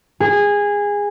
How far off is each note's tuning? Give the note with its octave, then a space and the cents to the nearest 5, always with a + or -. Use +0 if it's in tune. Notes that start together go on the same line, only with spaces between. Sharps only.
G#4 -20